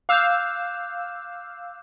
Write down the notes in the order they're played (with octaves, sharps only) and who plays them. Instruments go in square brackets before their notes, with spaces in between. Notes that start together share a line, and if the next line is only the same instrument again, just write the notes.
[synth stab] F5 E6 [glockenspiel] D6 F#6 G6